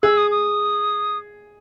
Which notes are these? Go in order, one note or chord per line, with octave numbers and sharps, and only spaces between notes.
G#4 E6
D#6
D#6